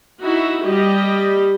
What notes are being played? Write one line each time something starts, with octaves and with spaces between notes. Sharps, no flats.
D#4 E4 F#4
G3 G4 D#5